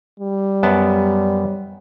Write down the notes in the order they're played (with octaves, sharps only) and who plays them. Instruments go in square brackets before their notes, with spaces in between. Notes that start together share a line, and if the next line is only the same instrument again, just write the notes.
[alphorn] G3
[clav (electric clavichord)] F#2 B3 A5